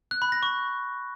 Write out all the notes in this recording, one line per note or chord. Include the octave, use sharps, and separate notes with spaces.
F#6
B5
A#6
C#6